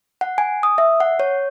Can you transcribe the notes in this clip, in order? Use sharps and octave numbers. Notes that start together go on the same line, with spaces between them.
F#5
G#5
D#6
E5
F#5
C#5